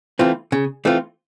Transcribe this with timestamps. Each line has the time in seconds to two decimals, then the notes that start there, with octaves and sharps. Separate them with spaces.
0.19 E3 A3 C4 F4
0.52 C#3
0.85 E3 A3 C4 F4